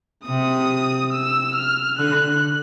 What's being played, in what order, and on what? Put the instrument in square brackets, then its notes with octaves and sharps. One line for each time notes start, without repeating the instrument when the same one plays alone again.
[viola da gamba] C3 [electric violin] D#6
[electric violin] E6
F6
[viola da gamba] D3 [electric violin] F#6